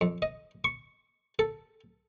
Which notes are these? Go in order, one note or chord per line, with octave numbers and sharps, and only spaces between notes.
F2
D#5
C#6
A4